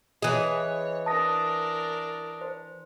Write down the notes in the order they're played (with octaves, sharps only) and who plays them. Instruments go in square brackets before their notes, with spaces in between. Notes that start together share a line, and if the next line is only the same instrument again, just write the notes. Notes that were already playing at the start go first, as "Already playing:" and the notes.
[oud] E3 G#4 [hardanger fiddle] C#5 [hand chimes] D#5
[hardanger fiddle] D4 A#4 [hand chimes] A5 D#6 A#6
[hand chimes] C5